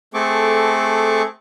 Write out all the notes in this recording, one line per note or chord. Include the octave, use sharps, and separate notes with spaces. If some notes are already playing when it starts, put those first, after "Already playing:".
A3 C4 G#4 A4 C#6 D6